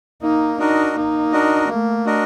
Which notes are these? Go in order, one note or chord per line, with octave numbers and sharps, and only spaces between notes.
A#3 D#4
D4 D#4 F#4 A#4 D#5
A#3 D#4
D4 F#4 A#4 D#5
A3 A#3
D4 F#4 A#4 D#5